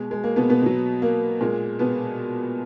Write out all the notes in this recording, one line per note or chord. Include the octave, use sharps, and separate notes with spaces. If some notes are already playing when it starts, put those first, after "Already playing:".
Already playing: B2 G#3
G#3
A#3
B2 B3
B2 B3
B2 F#3
A#3
A#2 G#3
B2 B3